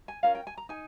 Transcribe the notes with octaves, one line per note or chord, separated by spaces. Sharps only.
G#5
C#4 F4 A#4 F5
G5
G#5
A#5
D#4 G#5